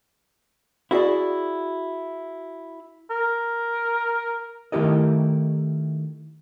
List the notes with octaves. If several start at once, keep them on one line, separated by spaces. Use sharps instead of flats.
E4 F#4 G#4 D5 F5
A#4
D#3 A3 E4 G4 A#4 D#5